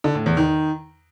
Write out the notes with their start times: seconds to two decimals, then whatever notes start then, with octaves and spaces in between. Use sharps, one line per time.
0.04 D3
0.15 A2
0.26 E2
0.37 D#3